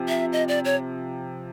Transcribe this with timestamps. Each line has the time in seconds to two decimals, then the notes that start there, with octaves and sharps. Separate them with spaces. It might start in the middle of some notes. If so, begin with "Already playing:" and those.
Already playing: C3 F3
0.08 E5
0.32 D#5
0.48 D5
0.65 C#5